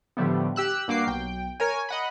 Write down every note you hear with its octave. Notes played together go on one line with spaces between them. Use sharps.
A2 D3 F3 G3 A3 B3
G4 E6 F#6
G2 A#3 F#4 D6 C7
B1 G5
A#4 C#5 G#5
D#5 F#5 B5